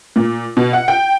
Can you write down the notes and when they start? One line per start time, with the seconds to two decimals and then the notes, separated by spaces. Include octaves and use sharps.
0.16 A#2
0.57 B2
0.73 F#5
0.88 G5